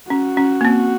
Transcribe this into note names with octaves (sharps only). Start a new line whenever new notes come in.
C#4 F#4
C#4
A#3
C4